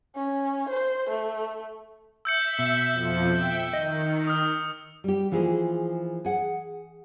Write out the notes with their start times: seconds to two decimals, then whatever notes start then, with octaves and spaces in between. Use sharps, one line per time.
0.16 C#4
0.69 C5
1.10 A3
2.25 E5 E6 G6 C#7
2.59 B2
2.91 F2 F3
3.27 E5 G5
3.73 D#3 D#5
4.27 D#6 F6
5.04 G3 G4
5.32 E3 F3 A#3 G#4
6.25 G#4 F#5